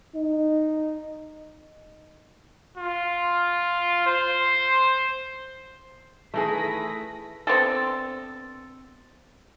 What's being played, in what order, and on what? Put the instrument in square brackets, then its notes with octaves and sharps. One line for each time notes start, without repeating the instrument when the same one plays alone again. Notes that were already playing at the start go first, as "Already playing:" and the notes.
[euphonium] D#4
[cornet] F4
C5
[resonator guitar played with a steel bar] D#3 E3 G#4 [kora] A3 [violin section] B4 A#6 B6
[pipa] B3 C4 D4 A4